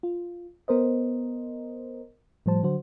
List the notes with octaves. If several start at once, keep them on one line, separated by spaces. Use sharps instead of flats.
F4
B3 A#4 C5 D#5
A2 F3 G3 C5 A5
D3 F#3 F#4 C5